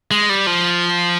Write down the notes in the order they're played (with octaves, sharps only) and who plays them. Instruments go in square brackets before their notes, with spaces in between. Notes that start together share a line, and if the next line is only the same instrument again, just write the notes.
[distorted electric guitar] G#3
G3
F3